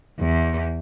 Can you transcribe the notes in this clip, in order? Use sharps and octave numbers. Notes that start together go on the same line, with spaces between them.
E2